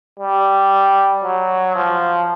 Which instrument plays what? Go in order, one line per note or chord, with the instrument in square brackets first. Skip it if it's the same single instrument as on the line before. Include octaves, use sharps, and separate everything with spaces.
[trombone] G3
F#3
F3